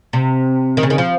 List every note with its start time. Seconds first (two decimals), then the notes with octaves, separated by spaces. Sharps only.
0.13 C3
0.77 D#3
0.83 C#3
0.90 D#3
0.98 F3